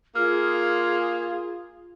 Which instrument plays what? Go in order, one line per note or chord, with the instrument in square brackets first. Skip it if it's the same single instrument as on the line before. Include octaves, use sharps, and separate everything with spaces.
[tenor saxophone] A#3 [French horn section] F4 [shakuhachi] G#4 [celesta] F6